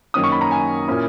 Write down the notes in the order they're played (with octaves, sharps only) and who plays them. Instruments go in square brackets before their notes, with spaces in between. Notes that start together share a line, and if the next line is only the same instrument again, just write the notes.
[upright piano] F#2 D#3 A#3 C#4 D#6
C#6
B5
A#5
G#5
A#2 A#3 C#4 E4